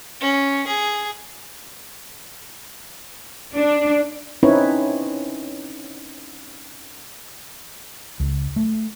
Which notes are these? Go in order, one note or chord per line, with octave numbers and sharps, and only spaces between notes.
C#4
G#4
D4
C4 C#4 D#4 E4 B4 C#5
C#2
A3